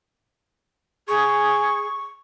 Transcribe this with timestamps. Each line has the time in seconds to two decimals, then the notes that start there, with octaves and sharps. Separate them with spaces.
1.08 G#4 C#6